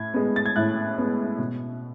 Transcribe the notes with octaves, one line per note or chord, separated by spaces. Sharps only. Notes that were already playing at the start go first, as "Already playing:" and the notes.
Already playing: A2 G#6
G#3 B3
A6
G#6
A2 F#6
G#3 B3
B2